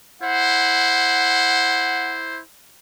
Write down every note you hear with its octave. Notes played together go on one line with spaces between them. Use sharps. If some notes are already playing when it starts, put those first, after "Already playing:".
E4 C5 F#5